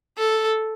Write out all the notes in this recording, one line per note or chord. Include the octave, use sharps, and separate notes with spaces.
A4